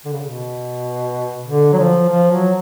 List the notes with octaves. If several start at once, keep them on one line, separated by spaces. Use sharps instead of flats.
D3
C#3
B2
D3
F#3
F3
F3
F#3